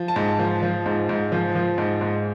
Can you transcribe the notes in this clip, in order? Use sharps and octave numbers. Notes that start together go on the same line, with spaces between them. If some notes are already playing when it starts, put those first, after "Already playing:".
Already playing: F3
A5
G#2
F3
F3
G#2
G#2
F3
F3
G#2
G#2